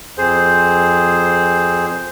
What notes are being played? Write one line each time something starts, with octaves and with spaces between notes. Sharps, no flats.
F2 G#4 C5